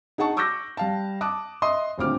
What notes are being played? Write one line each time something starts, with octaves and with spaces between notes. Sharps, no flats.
D#4 G#4 F#5 A5 C#6
C#6 D6 E6 F#6 G6 A#6
G3 F5 A5
A5 D6 D#6 F#6
D#5 E5 C6 D#6
D#1 D2 C4 F4 D6 F6